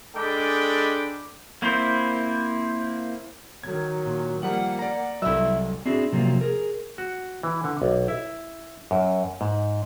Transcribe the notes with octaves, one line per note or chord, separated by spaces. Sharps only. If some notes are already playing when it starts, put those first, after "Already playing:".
G#3 D4 A4 G5 B5 D6
A#3 C4 E4 C5
D#3 F#3 G#6
A#2
F3 G3 A#3 F#5
D5 A#5
C2 F#3 E4 A4 E5
C4 D4 E4 F#4 G#4
C3 F3 F#3 A#3
G#4 A#4
F#4
E3
D3
B1
E4
F#2
G#2